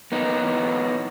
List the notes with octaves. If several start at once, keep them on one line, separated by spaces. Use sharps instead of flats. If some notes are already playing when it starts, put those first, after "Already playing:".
A#3 B3 D#4
E3